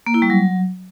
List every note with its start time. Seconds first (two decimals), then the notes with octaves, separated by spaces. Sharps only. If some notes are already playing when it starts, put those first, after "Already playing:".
0.07 A#3
0.14 E4
0.22 G3
0.30 F#3